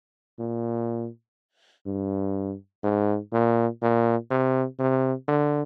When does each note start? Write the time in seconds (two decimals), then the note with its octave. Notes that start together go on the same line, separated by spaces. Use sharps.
0.39 A#2
1.86 G2
2.83 G#2
3.33 A#2
3.82 A#2
4.30 C3
4.79 C3
5.28 D3